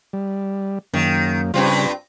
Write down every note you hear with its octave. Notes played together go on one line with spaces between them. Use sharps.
G3
F#2 D#3 A#3
G2 C#3 G3 C4 F4